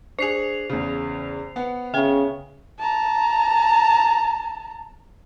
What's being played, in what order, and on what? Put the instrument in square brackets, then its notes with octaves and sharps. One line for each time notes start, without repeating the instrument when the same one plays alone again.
[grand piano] D4 G#4 [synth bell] C5 C7 F7
[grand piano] E2 C#3
B3 F#5
[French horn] C#3 [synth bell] E5 G5
[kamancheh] A5 A#5